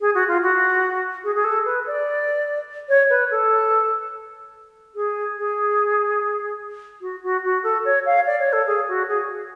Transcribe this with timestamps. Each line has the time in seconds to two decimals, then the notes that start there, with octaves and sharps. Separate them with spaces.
0.01 G#4
0.14 F#4
0.28 F4
0.42 F#4
1.24 G#4
1.35 G#4
1.44 A4
1.65 B4
1.87 D5
2.89 C#5
3.10 B4
3.31 A4
4.95 G#4
5.37 G#4
7.01 F#4
7.23 F#4
7.44 F#4
7.63 A4
7.85 C#5
8.06 F5
8.26 D5
8.40 C#5
8.53 A4
8.66 G#4
8.88 F#4
9.09 G#4